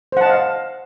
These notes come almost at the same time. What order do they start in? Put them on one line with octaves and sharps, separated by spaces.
C5 F#5 A5 D#5 F5